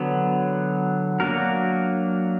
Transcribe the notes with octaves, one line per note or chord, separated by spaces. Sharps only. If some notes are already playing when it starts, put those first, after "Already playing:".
Already playing: D3 F#3 B3
F#3 A#3 D4 F#4 A#4